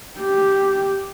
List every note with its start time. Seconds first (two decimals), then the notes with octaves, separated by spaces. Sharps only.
0.19 G4